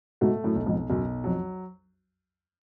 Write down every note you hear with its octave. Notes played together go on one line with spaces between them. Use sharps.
G#2 B2 A3
F#2 A2
B1
F2 G#2
B1 F#2
F2 F#3